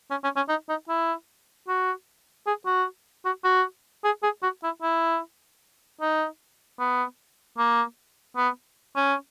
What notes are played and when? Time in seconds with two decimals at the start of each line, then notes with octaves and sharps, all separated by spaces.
0.11 C#4
0.24 C#4
0.36 C#4
0.49 D#4
0.69 D#4
0.89 E4
1.68 F#4
2.47 G#4
2.66 F#4
3.25 F#4
3.44 F#4
4.04 G#4
4.23 G#4
4.43 F#4
4.63 E4
4.82 E4
6.01 D#4
6.80 B3
7.58 A#3
8.36 B3
8.96 C#4